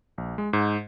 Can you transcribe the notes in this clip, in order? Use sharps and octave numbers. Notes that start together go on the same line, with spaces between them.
A#1
G#3
G#2